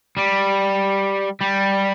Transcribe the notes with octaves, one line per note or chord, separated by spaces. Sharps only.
G3
G3